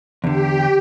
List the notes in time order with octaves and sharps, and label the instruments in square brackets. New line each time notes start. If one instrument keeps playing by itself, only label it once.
[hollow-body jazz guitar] E2 D3 [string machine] G4